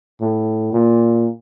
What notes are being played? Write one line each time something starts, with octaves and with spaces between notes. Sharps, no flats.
A2
A#2